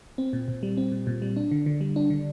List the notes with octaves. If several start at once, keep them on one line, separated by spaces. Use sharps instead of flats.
C4
A#2
A#2
G3
C4
A#2
A#2
G3
D4
D3
D3
G3
D4
D3